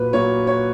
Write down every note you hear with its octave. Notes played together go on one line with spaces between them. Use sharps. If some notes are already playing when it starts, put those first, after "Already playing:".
Already playing: A#2 F#3 B4
A#2 F#3 C#5
C#5